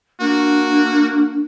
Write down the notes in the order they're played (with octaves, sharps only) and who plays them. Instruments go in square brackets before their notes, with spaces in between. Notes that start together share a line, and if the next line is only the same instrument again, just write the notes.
[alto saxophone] A#3 [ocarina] D4 [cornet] F#4